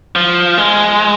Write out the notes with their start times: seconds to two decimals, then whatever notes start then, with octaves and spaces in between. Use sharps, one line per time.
0.16 F3
0.58 G#3